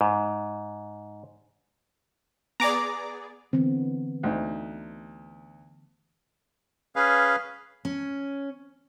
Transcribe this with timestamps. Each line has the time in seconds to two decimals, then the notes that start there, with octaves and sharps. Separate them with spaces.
0.01 G#2
2.60 B3 G#4 D5 A#5 D6
3.53 D3 E3 B3 C4
4.23 D2 D#4
6.96 C#4 G#4 B4 F5
7.85 C#4